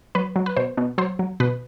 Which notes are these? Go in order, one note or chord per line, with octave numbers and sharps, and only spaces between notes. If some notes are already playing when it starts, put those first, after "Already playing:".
F#3 B4
F#3
B4
B2 C5
B2
F#3 C5
F#3
B2 B4